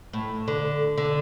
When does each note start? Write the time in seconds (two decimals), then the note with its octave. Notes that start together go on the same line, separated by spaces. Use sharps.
0.13 A2
0.48 D3
0.97 D3